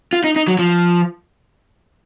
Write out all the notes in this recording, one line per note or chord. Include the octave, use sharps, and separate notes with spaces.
F4
D#4
D#4
F#3
F3